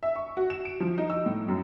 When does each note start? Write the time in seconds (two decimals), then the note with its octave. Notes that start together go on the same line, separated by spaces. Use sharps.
0.03 E5
0.16 C#6
0.37 F#4
0.50 E7
0.65 D7
0.80 F3
0.98 D#4
1.10 E6
1.26 A2
1.48 F#2